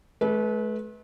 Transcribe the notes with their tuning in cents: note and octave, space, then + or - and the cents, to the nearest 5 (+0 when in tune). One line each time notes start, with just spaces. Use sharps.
A3 -45 B4 -15